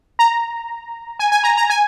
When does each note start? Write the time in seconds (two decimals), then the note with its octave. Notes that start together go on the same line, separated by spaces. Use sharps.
0.19 A#5
1.19 G#5
1.32 G#5
1.44 A#5
1.57 A#5
1.70 G#5